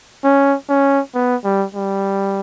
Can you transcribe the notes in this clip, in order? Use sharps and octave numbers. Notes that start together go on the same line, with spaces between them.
C#4
C#4
B3
G3
G3